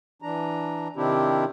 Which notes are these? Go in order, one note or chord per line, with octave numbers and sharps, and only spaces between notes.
E3 D4 A#5
C3 D#3 C4 D4 E4 G4